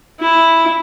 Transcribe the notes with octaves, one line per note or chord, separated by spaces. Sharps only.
E4